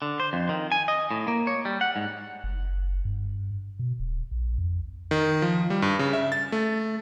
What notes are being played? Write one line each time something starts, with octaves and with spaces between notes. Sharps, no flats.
D3
C5
F2
D#3
G#5
D#5
A2
A#3
C#5
G3
F#5
G#2
F#1
G2
B2
D1
A#1
F2
D#3
F3
G3
G2
C#3
E5
A6
A3